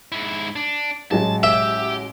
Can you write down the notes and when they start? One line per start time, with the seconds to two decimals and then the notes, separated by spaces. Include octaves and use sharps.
0.12 G#2 E4
0.56 D4
1.11 A1 F#3 G#3 A5
1.43 G4 E5